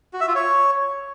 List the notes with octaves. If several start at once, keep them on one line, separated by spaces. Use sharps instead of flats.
F#4
E5
F4
C#5